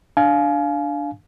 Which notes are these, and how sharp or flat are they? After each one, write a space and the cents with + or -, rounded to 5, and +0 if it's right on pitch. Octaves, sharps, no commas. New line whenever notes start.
D4 +0 F5 +0 G#5 +30